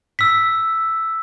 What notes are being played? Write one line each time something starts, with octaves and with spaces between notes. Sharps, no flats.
E6 B6